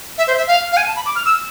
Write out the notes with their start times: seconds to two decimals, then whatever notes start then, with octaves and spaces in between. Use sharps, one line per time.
0.18 E5
0.27 C5
0.37 E5
0.47 F5
0.72 F5
0.77 G#5
0.87 A5
0.96 B5
1.06 D6
1.16 F6
1.25 E6